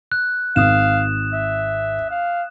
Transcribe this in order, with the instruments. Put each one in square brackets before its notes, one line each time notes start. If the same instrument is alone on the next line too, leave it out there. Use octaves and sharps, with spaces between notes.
[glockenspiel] F#6
[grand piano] G#1 [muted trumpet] F5 [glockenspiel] D#6 F#6 E7
[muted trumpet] E5
F5